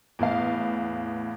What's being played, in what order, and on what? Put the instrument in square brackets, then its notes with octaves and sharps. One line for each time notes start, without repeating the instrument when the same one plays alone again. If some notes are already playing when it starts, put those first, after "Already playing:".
[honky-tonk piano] E2 A2 B3 F5